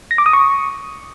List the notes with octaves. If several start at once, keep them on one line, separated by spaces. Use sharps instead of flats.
A#6
D6
D#6
C#6